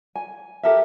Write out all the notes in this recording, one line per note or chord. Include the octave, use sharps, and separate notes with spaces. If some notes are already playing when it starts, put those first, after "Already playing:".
G#5
G4 A4 A#4 E5